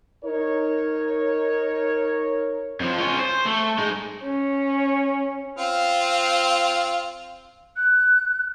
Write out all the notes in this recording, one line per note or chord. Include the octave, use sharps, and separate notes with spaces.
D#4 A#4 C#5
F2 F3
C#4 F4
C5
A3
G#3 D#4
C#4
C4 F4 F5
F#6